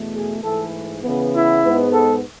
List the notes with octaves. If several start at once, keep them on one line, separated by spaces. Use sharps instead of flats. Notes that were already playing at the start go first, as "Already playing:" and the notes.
Already playing: E2 B2 A3
G#4
G#2 E3 A3 A4
C#3 E3 B3
E4
G#2 G#3 B3
A4